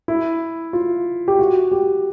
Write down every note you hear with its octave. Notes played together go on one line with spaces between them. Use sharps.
E4
F4
G4
F#4
G4